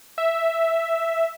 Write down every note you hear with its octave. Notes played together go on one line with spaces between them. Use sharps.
E5